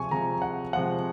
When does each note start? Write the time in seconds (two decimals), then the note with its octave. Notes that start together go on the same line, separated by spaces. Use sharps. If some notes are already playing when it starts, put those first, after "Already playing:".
Already playing: C3 F3 G#3 G#5 C#6
0.11 C3 F3 G#3 A#5
0.42 F#5
0.73 C3 F3 G#3 F#5